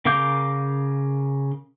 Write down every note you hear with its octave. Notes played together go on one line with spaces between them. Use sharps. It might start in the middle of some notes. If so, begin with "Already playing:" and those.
C#3 A#4 F5 D6 G6